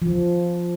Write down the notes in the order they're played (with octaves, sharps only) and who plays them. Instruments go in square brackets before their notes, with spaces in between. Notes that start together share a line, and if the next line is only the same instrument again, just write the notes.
[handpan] F3